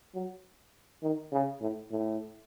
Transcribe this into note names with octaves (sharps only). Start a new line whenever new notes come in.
F#3
D#3
C#3
A2
A2